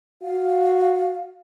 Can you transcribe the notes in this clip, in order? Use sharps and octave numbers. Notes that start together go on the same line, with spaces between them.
F#4 F5